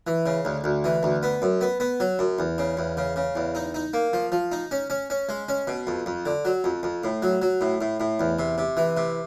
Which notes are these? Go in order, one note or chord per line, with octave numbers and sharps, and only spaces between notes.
E3
C#3
D2
D2
E3
D2
B3
F#2
B3
B3
F#3
F#2
E2
C#3
E2
C#3
C#3
E2
D#4
D#4
A#3
F3
F3
D#4
C#4
C#4
C#4
G#3
C#4
B2
F2
F2
D3
F#3
F2
F2
A2
F#3
F#3
A2
A2
A2
E2
C3
C3
E3
C3